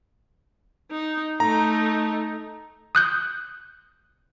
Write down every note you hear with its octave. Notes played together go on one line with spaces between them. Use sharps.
D#4
A3 D#4 A#5
D#6 F#6 G6